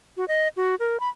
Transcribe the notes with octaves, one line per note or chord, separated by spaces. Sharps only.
F#4
D#5
F#4
A#4
B5